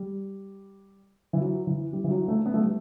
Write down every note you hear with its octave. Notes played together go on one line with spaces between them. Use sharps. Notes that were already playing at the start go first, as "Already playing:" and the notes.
Already playing: G3
E3
F#3
E3
G3
E3
F#3
A3
B3
A3
G3